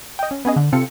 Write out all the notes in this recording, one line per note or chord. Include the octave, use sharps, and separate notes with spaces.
D#5 G5
C#4
B3 C#4 G#4 D#5
D3
C3 C4 F4 A4 C#7